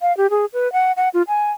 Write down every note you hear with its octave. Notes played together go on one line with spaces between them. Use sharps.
F5
G4
G#4
B4
F#5
F#5
F4
G#5